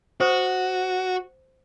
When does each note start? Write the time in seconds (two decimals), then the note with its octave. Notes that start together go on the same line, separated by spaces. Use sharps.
0.20 F#4 C5 D#6